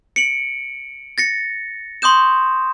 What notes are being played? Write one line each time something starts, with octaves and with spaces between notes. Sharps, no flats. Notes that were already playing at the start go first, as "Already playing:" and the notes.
C#7 D7 F#7
A6 A#6 C#7
C6 C#6 D#6 G6 E7